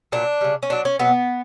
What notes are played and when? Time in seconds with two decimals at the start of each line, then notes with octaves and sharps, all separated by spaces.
0.12 A#2 F#3 D4
0.41 C#3 G3
0.63 C#4
0.70 B2 F#3 D4
0.85 C#4
0.99 B2 F#3 B3